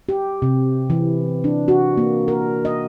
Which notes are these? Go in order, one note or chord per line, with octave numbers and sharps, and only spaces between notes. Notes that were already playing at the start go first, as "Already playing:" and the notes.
G4
C3
E3
D4
F#4
A#3
A#4
D#5